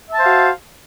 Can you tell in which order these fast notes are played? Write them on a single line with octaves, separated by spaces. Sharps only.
E5 A5 C5 F5 F#4